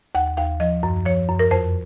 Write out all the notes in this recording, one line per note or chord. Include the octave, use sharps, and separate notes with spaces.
D#2 F#5
D#2 F5
F3 D#5
F#2
F3 C#5
F#2
A#4
F2 C5